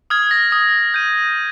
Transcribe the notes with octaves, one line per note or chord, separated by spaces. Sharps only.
D#6 F6 G#6
G#6 A#6
D#6
G6 D#7